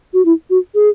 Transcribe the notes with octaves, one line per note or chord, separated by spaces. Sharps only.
F#4
E4
F#4
G#4